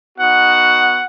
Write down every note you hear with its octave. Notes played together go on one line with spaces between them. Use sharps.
B3 D#4 F#4 F#5